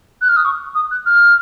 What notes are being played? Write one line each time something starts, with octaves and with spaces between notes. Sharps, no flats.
F#6
F6
D#6
C#6
D#6
F#6
F6